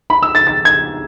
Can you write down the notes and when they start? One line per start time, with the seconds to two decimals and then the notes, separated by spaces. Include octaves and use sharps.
0.10 B5
0.23 E6
0.35 A6
0.47 A6
0.65 G#6